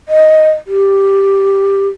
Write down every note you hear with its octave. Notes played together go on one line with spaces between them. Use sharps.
D#5
G4